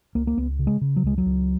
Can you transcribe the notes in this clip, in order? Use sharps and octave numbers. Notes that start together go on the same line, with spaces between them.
C#2 A#3
A#3
C#2 B3
C#3
G#3
C#3
F#3
C#2 G#3
F#3
C#2